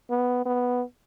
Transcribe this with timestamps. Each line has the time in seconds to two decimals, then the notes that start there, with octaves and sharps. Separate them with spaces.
0.10 B3
0.45 B3